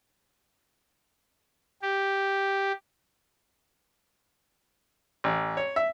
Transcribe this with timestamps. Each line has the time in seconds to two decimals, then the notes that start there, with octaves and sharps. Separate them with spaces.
1.82 G4
5.24 A1
5.57 C#5
5.76 E5